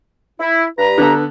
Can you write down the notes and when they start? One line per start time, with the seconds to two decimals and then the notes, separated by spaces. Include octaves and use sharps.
0.40 E4
0.78 G2 B4 A#5
0.98 D3 B3 A4